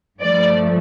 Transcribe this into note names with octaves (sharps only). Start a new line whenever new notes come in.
G2 F3 A3 D5